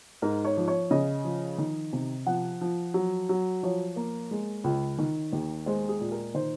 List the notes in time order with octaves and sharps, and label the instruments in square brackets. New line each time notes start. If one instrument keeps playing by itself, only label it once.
[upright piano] G#2 A#4
C#5
F3
C#5
C#3 D#5
F3
D#3
C3
F3 F#5
F3
F#3
F#3
F3 C#5
A#3
G#3
C#2
D#3
D#2
G#3 C5
G#4
A#2
A#4
D#3 C5